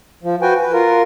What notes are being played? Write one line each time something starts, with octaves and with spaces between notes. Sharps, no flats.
F3
F#4 B4 G5 G#5
B4
F4 A#4